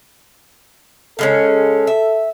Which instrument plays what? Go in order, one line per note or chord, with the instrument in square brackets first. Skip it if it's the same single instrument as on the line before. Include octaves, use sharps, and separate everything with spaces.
[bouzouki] C#3 G#3 C#4 [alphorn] A4
[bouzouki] E5